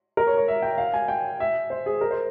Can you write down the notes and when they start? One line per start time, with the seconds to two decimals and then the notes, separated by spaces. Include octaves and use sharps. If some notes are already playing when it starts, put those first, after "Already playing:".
0.17 A#4
0.27 C#5
0.37 C#5
0.48 E5
0.62 G5
0.78 F5
0.94 G#5
1.08 G5
1.40 E5
1.70 C5
1.86 G#4
2.01 A#4
2.11 C5